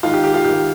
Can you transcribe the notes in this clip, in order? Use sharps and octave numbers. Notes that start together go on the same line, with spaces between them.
G#2 D#3 F4
G4
G4
F4
G#2 D#3 G4